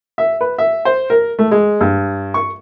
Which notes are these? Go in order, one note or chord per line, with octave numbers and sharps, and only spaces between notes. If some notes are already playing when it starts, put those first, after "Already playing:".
E5
B4
E5
C5
A#4
A3
G#3
G2
C#6